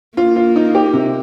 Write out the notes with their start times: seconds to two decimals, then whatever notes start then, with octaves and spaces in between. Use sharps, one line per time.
0.17 A#3 F4
0.36 F4
0.56 D#4
0.75 G4
0.93 C3